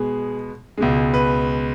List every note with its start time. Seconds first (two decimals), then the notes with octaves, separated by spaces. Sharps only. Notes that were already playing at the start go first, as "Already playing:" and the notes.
Already playing: B2 G#3 B3 G#4
0.78 C#2 B2 G#3
1.14 B4